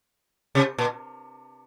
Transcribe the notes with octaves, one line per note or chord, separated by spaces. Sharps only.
C3
A#2